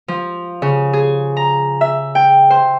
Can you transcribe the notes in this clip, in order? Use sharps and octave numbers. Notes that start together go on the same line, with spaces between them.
F3
C#3
G#4
A#5
E5
G5
C5